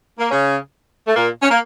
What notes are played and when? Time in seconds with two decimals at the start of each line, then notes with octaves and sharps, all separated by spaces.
0.19 A#3
0.30 C#3 C#4
1.07 A3
1.15 A#2 A#3
1.42 C#4
1.50 A#3